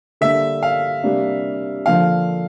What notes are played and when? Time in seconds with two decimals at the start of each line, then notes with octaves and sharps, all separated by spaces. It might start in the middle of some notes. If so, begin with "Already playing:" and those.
0.21 D3 G3 A#3 E5
0.63 F5
1.03 C3 G3 A#3 D4
1.86 D3 F3 A#3 F5